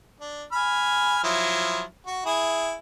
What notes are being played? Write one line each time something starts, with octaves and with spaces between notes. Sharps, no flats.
D4
G#5 B5 F6
F3 F#3 E4
F#4
E4 G#4